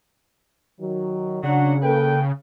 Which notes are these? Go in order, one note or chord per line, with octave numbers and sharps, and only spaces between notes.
D#3 F#3
C#3 F#3 D4 F#5
A#3 A4 B4 G5